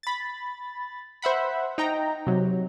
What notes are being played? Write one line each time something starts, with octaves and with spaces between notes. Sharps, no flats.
B5 A6
C5 E5 F#5 B5
D#4 G5 A#5
C3 F#3